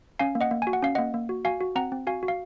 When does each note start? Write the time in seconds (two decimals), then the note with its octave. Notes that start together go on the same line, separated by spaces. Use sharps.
0.19 C#4 F5 G#5
0.35 A#3
0.41 D#5 F#5
0.51 A#3
0.62 F#4 G#5
0.73 F#5
0.82 C#4 F5
0.95 A#3 D#5 F#5
1.14 A#3
1.29 F#4
1.45 F#4 F5 G#5
1.60 F#4
1.75 C4 F#5 A#5
1.92 C4
2.07 F#4 F5 G#5
2.23 F#4
2.28 F5